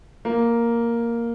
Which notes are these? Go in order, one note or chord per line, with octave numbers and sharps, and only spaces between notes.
A#3